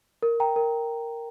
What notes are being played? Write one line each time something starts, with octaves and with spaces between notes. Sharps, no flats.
A#4
G5 A#5
A#4